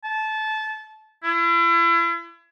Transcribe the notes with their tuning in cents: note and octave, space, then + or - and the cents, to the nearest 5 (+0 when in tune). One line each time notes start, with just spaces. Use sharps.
A5 -20
E4 +40